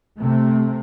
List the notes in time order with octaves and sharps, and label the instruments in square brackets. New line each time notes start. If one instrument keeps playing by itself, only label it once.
[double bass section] C3 A3